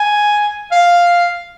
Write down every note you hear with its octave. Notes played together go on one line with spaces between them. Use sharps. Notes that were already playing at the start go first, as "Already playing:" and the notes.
Already playing: G#5
F5